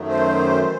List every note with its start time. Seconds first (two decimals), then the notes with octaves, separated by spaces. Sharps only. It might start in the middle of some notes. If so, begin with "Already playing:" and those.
Already playing: F#2 D#3 F#3 A3
0.09 C5
0.64 E3